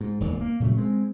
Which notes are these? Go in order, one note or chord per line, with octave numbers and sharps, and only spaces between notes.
G#2
E1 D#2 G#2
A#3
A#2 C#3 F#3 A3
G#3 C4